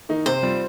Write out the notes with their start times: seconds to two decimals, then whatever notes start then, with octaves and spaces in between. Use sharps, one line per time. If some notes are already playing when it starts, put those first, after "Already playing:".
0.09 D#3 A#3 D#4
0.26 C3 C5
0.43 G3 C4 F4